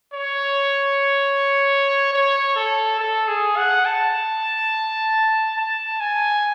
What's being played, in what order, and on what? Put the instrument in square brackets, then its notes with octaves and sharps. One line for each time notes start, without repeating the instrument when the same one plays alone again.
[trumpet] C#5
C#5
A4
A4
G#4
F#5
A5
A5
G#5